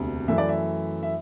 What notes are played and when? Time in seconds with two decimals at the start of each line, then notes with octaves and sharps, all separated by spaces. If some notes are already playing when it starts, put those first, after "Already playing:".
Already playing: E1 D2 C3
0.28 F#2 E3 A3 E5
0.38 D5
0.49 E5
1.03 E5